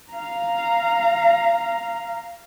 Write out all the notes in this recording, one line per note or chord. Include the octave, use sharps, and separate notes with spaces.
F5 A#5